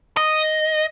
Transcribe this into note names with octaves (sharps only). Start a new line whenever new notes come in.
D#5